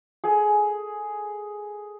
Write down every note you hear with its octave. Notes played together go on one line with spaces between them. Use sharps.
G#4 A4 G#5